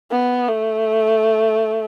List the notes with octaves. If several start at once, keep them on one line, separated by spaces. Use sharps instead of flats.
B3
A3